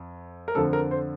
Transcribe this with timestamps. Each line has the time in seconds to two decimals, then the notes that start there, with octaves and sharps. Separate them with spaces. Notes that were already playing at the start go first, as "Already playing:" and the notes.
Already playing: F2
0.48 A#4
0.55 F2 D3 F3 A4
0.73 A#4
0.91 C5